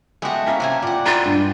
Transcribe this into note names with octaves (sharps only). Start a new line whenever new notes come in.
G#3 A3 B3 F#4 G4
A#3 C#4 E4 E5
C3 A3 G#5
A#2 C4 D5 F#5
G#3 E4 F4 A#5
G2 C5